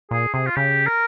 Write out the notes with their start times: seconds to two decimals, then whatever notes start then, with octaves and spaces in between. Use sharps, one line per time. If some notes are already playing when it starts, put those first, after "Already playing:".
0.11 A#2 G#4
0.34 C3 G#4
0.46 F4
0.56 C#3 G4
0.86 A#4